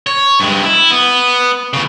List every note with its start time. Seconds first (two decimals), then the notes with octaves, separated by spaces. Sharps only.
0.07 C#5
0.40 G2 G#3
0.64 E4
0.91 B3
1.73 E2 C#3